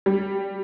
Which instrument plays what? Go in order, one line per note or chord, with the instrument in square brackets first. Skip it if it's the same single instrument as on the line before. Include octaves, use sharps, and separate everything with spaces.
[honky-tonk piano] G3